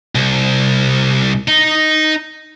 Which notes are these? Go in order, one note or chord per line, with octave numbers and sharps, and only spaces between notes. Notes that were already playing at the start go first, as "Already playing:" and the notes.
C2
D#4